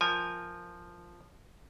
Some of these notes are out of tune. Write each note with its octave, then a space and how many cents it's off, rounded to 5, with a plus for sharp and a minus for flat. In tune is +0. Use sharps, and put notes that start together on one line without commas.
F3 +0 A#4 +0 G#5 -20